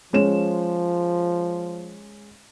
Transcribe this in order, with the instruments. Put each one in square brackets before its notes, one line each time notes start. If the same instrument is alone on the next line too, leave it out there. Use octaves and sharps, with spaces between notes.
[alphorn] F3 [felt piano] G#3 C#4 E7